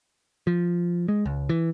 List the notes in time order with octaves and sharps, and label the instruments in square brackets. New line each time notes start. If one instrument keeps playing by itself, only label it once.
[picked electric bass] F3
G#3
C#2
E3